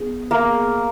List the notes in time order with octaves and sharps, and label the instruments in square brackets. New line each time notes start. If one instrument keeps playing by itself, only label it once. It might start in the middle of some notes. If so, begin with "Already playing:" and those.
Already playing: [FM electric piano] B3 D#4 G#4
[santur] A#3